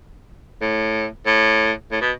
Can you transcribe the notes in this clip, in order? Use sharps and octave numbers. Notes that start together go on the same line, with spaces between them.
A2
A2
A2
B2